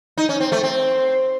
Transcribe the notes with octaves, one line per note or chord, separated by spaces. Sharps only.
D#4
C#4
C4
A3
C4